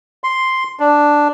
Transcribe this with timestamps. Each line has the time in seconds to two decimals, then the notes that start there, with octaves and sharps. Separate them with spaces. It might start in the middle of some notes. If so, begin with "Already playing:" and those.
0.24 C6
0.80 D4